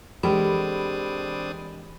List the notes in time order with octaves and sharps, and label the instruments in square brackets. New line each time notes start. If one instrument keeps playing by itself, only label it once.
[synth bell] E3 B5 [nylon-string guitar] G#3 G4 A#4 [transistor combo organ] C4 D4 D#6